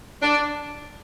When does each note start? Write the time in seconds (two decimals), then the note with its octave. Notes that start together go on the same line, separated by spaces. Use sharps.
0.22 D4